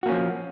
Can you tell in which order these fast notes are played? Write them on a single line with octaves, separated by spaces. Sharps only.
F#4 A#3 C#4 F3